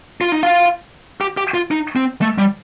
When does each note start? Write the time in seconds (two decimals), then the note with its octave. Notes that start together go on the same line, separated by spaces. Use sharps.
0.21 F4
0.32 D#4
0.43 F4
1.21 G4
1.37 G4
1.54 F4
1.71 D#4
1.96 C4
2.21 A3
2.38 G3